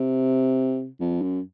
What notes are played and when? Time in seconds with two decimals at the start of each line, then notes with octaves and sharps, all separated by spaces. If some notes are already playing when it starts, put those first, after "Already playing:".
Already playing: C3
1.00 F2
1.21 F#2